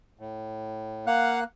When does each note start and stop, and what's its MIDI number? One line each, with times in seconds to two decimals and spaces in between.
0.19 1.06 45
1.07 1.44 58
1.07 1.40 77
1.07 1.40 78
1.07 1.44 90